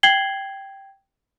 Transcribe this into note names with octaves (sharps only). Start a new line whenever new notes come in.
G5 G#6 C7 F#7 G7